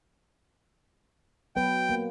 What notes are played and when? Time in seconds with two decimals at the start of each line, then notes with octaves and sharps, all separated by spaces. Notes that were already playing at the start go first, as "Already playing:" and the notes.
1.56 F#3 B3 B4 G5
1.89 A#3